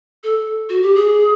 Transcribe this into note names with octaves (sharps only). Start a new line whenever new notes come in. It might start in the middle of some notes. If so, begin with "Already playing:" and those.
A4
F#4
G4
G#4